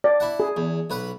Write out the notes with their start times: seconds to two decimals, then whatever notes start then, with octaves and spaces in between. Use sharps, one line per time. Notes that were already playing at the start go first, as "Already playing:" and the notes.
0.04 D5
0.20 E4 F#5
0.40 G#4
0.57 E2
0.90 B1 B4 F#5